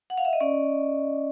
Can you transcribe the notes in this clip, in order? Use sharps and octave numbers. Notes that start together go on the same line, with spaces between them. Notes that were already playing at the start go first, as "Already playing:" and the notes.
F#5
F5
E5
D#5
C#4 D5